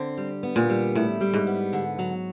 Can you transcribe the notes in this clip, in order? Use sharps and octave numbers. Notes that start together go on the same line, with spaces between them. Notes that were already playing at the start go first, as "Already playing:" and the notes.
Already playing: D3 C4
G3
B3
A#2
G3
A2 E4
G3
G#2
B3
D3
F#3